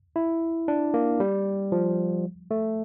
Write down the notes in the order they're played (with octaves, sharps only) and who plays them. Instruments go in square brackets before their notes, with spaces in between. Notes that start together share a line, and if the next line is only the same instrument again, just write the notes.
[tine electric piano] E4
D4
A#3
G3
F3
A3